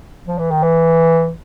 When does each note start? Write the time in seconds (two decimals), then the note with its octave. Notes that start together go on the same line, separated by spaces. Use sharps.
0.27 F3
0.38 E3
0.51 D#3
0.63 E3